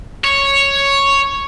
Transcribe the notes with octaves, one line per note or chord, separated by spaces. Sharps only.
C#5